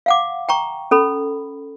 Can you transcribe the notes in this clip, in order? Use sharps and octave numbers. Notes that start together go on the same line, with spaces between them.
F5 F#5 D6
G5 A#5 C#6
C#4 A4 B5